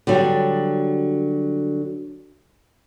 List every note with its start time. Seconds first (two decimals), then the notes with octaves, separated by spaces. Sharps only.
0.07 D3 F#3 G3